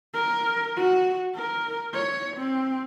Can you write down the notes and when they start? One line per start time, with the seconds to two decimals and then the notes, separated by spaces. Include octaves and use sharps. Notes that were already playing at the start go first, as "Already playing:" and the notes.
0.14 A#4
0.76 F#4
1.36 A#4
1.94 C#5
2.37 C4